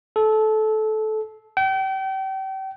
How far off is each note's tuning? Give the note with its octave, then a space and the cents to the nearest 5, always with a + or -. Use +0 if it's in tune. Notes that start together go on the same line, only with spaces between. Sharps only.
A4 -20
G5 -35